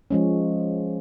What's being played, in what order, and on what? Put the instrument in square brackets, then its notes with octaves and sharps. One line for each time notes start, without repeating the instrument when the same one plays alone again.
[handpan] F3 G#3 C#4